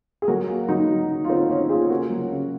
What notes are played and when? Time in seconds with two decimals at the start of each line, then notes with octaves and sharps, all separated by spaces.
0.22 G#4
0.28 F#3 F#4 A#4
0.48 A#3
0.69 F#3 D#4 F#4
0.89 F#3
1.09 D#3
1.24 F4
1.29 D#3 C4 D#4
1.50 D#3 C#4
1.69 A#3 F4 G#4
1.90 C#3 F#4 A#4
2.10 F#3
2.30 C#3